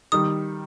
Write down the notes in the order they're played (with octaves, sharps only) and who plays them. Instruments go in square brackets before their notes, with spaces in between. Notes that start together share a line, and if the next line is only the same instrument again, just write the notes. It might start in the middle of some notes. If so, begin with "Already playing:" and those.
[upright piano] D#3 G3 [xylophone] D#6